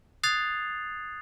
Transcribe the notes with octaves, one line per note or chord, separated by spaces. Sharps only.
D#6 F#6 G#6 A6 C7 F7